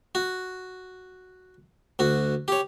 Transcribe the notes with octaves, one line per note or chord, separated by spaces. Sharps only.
F#4
D2 F#4
G4 C#5